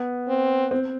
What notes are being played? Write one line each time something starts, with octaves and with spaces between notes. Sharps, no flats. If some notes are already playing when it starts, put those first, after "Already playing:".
Already playing: B3
C4
C4